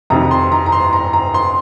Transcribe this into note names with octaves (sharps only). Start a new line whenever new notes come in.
F2 C3 D#3 A#5
C6
A#5
A#5
C6
A#5
A#5
C6